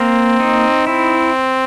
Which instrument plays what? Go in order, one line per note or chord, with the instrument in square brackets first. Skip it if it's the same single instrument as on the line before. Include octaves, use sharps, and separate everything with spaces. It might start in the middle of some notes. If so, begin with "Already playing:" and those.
Already playing: [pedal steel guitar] A#3 [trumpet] C4
[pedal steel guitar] D#4
[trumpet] C4 [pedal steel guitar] E4